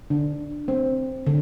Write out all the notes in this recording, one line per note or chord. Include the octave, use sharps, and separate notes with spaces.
D3 D4
C4
D3